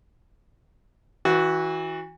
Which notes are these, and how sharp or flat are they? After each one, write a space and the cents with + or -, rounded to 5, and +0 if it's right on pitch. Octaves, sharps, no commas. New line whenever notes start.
E3 -25 F#4 +0